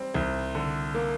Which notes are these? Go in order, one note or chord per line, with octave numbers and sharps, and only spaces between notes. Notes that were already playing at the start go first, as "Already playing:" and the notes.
Already playing: G3 C4
C2
D3
A#3